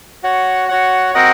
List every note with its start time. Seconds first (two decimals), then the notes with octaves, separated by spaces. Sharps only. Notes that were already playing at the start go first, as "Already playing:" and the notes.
0.23 F#4 C#5 F#5
0.68 F#4 C#5 F#5
1.14 C4 F#4 A#4 D#5 F#5